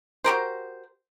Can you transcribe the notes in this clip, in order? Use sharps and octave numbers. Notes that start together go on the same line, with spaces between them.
F#4 G4 A#4 C5